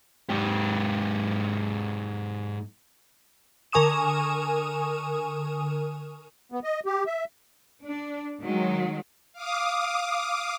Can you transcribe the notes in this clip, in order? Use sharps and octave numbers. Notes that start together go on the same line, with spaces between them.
G#2 G4
D3 A#4 G#5 C#6 D#6 E7
B3
D#5
G4
E5
D4
D#3 F#3 G#3
F5 D6 D#6